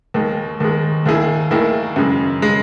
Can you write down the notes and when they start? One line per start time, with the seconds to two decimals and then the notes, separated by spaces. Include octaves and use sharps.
0.14 D#2 D#3 G#3
0.60 D#2 D#3 G#3
1.06 D#2 D#3 A#3 E4 G#4
1.51 D#2 D#3 A#3 E4 G#4
1.96 F#2 C#3 G#3
2.42 C#3 G#3